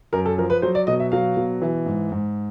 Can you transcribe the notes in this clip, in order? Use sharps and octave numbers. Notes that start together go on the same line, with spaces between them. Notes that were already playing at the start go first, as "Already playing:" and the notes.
F#2 A#4
A4
F3 A#4
B4
F#3 C5
D5
B2 D#5
E5
F#3 F5
B2
E3
G#2
G#2